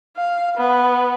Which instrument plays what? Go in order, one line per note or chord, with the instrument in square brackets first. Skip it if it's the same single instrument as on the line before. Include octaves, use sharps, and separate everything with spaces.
[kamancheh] F5
B3